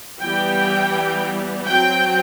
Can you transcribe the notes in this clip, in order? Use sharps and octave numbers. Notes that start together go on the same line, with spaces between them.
E3 G3 B3 G5
F#3 C4 G5